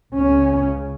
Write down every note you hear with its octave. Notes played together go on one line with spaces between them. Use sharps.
C#2 C#3 C#4